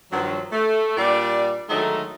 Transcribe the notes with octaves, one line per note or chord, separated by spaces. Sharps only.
G2 D#3 F3 F#3
A3
A#2 G3 D4 D5
D3 D#3 F#3 G#3 A3 D#4